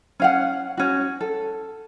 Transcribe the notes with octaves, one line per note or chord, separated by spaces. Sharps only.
C#4 F5 F#5
C#4 F#4
A4